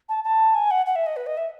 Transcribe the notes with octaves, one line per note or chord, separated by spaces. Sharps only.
A5
A5
G#5
F#5
F#5
E5
D#5
B4
D#5
E5